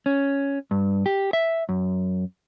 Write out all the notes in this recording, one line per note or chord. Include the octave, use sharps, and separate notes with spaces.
C#4
G2
G4
E5
F#2